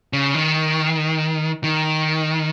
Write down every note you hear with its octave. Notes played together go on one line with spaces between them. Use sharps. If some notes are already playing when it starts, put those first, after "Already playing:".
C#3
D#3
D#3